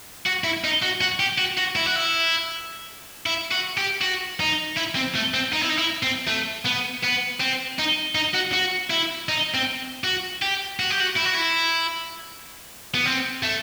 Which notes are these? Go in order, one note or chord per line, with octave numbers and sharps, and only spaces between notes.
F#4
E4
D#4
F#4
F#4
G4
F#4
F#4
E4
F#4
E4
E4
F#4
G4
F#4
D#4
E4
C4
A3
C4
D#4
E4
D#4
E4
C4
A3
B3
B3
C4
D#4
D#4
F#4
F#4
E4
D#4
C4
F#4
G4
F#4
G4
F#4
E4
F#4
E4
B3
C4
A3